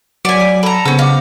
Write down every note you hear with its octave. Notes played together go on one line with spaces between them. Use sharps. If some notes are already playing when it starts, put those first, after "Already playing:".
F#3 D5 F#5 G#5 B6
B6 D#7
A4 A#5 B5
C#3 B3 C#4 C5 F#5 E6
D#5 F5 F#5 D6